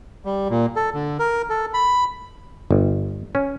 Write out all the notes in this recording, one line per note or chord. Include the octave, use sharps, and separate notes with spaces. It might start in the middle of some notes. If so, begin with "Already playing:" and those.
G3
A#2
A4
D3
A#4
A4
B5
G1
C#4